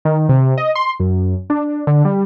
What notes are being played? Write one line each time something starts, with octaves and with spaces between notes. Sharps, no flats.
D#3
C3
D#5
C6
F#2
D4
D3
G3